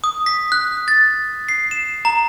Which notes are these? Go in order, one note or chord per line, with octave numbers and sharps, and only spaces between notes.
D#6
B6
F#6
A6
C7
E7
A#5